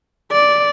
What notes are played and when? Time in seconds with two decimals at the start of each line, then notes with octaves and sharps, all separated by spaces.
0.32 D5